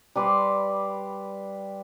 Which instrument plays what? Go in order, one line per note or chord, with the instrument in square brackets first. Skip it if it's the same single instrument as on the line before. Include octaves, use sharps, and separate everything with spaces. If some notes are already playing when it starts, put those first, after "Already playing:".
[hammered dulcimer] G3 B4 D5 C6